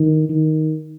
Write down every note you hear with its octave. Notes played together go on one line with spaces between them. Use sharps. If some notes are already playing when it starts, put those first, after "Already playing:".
Already playing: D#3
D#3